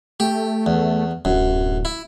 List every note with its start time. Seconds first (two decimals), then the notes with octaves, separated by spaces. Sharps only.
0.20 A3 G4
0.66 E2
1.25 D1 F#2
1.85 E4